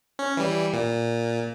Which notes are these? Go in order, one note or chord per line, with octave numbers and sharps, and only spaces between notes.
C#4
E3 G3
A#2